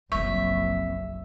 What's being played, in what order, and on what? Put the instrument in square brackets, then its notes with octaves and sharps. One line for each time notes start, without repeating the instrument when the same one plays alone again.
[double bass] F#1 B1 [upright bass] F3 C4 [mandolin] E5 [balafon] C#6